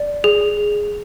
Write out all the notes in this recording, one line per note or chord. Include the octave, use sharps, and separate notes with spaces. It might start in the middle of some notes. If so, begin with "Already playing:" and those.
Already playing: D5
G#4